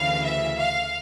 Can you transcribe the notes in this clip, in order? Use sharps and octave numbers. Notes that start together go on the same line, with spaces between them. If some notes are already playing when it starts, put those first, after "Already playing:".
Already playing: D2 C#3 E3 F5
E5
F5